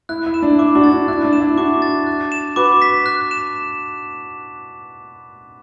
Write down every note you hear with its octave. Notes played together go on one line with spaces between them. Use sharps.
E4 F#6
E4
E7
D4
E4 D6
D4 F#4
A6
D4
E4 F#6
D4
E7
E4
D4 F#4 D6
A6
F#6
E7
F#4 B4 D6
B6
F#6
E7